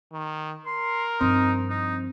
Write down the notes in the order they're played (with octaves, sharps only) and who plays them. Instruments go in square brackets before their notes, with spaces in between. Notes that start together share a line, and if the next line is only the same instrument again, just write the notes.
[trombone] D#3
[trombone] A#4 [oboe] C6
[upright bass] G2 F3 [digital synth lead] C4 [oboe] D#4
[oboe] D#4